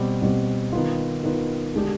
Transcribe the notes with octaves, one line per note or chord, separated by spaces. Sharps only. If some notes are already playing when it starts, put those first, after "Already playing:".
Already playing: B2 G3 C4
B2 G3 C4
D#3 B3 F4
D#3 B3 F4
D3 G#3 D4 G4